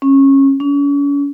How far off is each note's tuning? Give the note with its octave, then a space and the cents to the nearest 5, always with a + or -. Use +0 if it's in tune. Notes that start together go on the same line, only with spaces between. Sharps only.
C#4 -20
C#4 +40